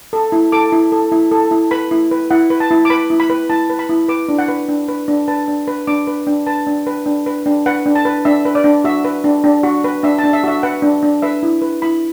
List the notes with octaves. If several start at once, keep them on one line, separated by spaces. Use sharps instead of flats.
A4
E4
A4 D6
E4
A4
E4
A4
E4
B4 B5
E4
B4
E4 F#5
B4
A5
E4
D6
B4 B5
E4
B5
B4
E4 A5
B4
B5
E4
B4 D6
D4
F#5
B4
D4
B4
D4
B4 A5
D4
B4
D4 D6
B4
D4
B4 A5
D4
B4
D4
B4
D4
B4 F#5
D4
A5
B4
D4 E5
B4
D5
D4
F#4 E5
B4
D4
D4
F#4
B4
D4 E5
A5
D4
E5
F#4 E5
B4 F#5
D4
D4
B4 E5
E4
B4
E4 B5